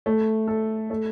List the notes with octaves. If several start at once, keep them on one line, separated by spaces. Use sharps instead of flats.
A3
A4
A3